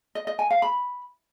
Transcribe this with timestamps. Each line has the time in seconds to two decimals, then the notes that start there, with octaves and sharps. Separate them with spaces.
0.15 D#5
0.27 D#5
0.39 G#5
0.51 F5
0.62 B5